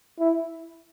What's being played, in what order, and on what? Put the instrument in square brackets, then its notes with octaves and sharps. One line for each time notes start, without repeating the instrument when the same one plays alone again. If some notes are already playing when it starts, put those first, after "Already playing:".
[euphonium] E4